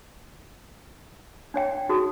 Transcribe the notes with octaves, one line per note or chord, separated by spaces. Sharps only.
D4 C#5 G5
D#4 F#4 G#4 D#6